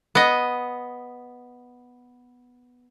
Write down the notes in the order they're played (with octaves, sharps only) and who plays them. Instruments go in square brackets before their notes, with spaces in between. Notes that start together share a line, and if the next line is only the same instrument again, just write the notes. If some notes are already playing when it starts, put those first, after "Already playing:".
[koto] B3 D#5